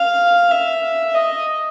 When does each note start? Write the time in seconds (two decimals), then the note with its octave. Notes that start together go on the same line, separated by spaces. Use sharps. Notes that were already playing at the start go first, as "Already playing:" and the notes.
Already playing: F5
0.51 E5
1.14 D#5